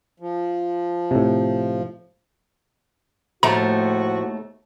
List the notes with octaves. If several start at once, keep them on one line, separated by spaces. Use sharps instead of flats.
F3
A2 C3
D#2 A2 F3 A3 F#4 A#5